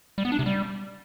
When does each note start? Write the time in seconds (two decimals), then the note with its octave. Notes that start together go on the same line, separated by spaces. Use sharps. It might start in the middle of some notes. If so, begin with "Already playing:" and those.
0.18 G3
0.25 B3
0.32 D4
0.39 C3
0.46 G3